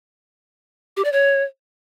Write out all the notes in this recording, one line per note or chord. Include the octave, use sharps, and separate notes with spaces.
G4
D5
C#5